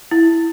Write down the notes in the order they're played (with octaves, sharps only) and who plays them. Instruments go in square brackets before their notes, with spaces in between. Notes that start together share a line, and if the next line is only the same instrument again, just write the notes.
[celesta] E4